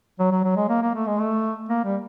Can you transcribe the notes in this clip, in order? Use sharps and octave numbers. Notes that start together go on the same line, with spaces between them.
F#3
F#3
F#3
G#3
A#3
A#3
A3
G#3
A3
A#3
G3